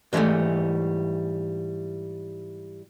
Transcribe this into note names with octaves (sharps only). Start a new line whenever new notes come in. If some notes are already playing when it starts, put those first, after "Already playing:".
G#2 E3 F#3 G3 A3